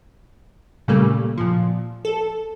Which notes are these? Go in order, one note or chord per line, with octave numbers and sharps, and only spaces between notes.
A#2 C#3 G3 A3 A#3
A#2 F3
A4